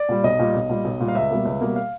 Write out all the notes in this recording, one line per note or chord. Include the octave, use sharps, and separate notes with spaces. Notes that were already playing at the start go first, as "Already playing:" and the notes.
Already playing: D5
A#2 G3
B1 D#5
A#2 G3
B1
A#2 G3
B1
A#2 G3
F5
C#2 E5
B2 G3 A#3
C#2
B2 G3 A#3
F5